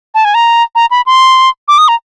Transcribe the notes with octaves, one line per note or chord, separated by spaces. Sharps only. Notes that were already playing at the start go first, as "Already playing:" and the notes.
A5
G#5
A#5
A#5
B5
C6
D6
D#6
A#5